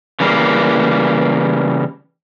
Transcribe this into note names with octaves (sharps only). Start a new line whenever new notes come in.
C#3 E3 G3 A#3